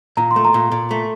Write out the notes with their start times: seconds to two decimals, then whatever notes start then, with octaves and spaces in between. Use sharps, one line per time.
0.17 A#2 A#5
0.31 C6
0.36 A3
0.45 A#5
0.54 A#2
0.72 A#2
0.91 A3